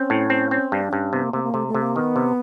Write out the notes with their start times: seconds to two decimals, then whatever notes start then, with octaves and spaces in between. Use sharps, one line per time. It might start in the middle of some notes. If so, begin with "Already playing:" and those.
Already playing: C4 C#4
0.10 A2
0.30 C4
0.51 C4
0.72 G2 D4
0.92 G2 C#4
1.12 C3 B3
1.23 A#3
1.33 C3 A#3
1.43 A#3
1.54 C3 A3
1.68 A3
1.74 C3
1.82 A#3
1.95 D#3 B3
2.16 C3